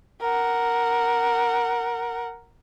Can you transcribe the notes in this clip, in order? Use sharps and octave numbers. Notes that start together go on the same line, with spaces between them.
A#4 F#5